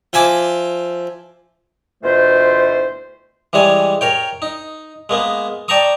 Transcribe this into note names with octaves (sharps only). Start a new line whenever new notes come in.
F3 E5 G#5 D6
D2 B2 E3 A3 F4 C5
E3 G3 G#3 C#5 G#5
A#4 C#5 G5
D#4
G#3 A#3 B3
D5 G5 A5 A#5 C#6 D#6